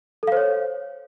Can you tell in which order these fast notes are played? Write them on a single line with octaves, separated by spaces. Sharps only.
A4 F5 C5 C#5